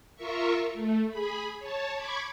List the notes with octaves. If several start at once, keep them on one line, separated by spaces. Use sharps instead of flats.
F4 A#4 E5 C#6
A3
G#4 B5
C#5 A5
B5 C#6 D6 G#6